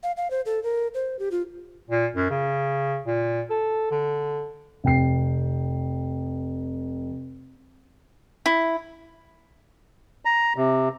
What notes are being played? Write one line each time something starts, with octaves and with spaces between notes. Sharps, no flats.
F5
F5
C5
A4
A#4
C5
G4
F4
A#2
F#2
C#3
A#2
A4
D3
F1 G5 C7
E4
A#5
C3